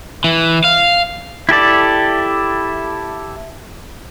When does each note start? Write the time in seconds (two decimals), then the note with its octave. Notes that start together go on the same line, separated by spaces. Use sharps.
0.24 E3
0.64 F5
1.49 E4 G4 A4 D5